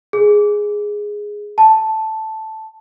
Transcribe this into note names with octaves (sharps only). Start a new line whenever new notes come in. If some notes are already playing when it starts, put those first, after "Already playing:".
G#4
A5